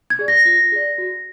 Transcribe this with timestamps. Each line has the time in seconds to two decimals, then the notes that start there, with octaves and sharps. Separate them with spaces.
0.10 G#6
0.19 G#4 D5
0.28 A#6
0.45 F4 A#6
0.72 G#4 D5
0.98 F#4